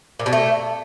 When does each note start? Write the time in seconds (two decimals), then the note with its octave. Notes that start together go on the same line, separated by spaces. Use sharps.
0.19 A#2
0.26 B2
0.33 A3